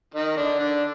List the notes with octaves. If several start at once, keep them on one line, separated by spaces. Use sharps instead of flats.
D#3 D#4
D3 D4
D3 D4